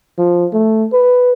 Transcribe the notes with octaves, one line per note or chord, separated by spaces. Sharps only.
F3
A3
B4